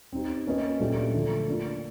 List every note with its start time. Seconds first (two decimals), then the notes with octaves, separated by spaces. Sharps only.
0.13 C4 D#4 G4
0.47 A#3 C#4 F#4 B4 D#5
0.80 A#2 F#3 A3 D4 G4
1.14 D3 F3 A3
1.48 A#3 D4 F4